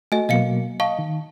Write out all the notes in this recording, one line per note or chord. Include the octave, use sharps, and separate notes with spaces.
A3 F#4 D#5 G#5
B2 F#3 A#3 D#5 F5 C#7
D#5 F5 A5 C#6
D#3